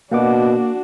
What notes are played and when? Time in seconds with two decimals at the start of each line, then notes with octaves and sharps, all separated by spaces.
0.12 B2 A#3 D4 F#4 F#5 D6